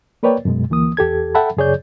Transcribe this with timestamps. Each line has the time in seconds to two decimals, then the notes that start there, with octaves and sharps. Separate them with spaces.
0.23 A#3 A#4 B4 C#5 D5 G5
0.45 F#2 B2 G#3
0.70 D2 E3 A#3 D#6
0.97 E2 G4 A4 G#6
1.35 A4 E5 F#5 G5 A5 B5
1.57 F#2 C#3 G#4 C#5 D5 G6